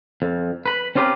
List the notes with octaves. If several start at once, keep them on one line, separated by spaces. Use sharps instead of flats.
F2
B4 B5
C4 C#4 F4 G4 A#4 B4